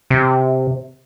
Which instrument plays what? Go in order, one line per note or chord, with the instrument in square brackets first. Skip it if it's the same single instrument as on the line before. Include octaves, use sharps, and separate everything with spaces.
[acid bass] C3